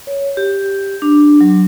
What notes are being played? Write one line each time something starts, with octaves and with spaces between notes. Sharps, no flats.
C#5
G4
D4
F#3